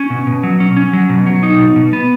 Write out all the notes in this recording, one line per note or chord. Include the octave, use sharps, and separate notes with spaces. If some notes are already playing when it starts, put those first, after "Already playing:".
Already playing: C#4
B2
B2
F#3
C#4
C#4
F#3
B2
F#3
D#4
B2
B2
B3